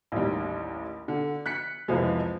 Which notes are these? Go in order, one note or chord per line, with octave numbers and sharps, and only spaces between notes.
A1 D#2 G3
D3
F#6 B6 C#7
C2 F2 C3 E3 F3 G#3